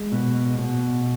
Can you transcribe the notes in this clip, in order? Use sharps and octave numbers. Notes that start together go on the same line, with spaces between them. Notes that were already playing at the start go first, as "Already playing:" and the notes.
Already playing: G#3
B2
B2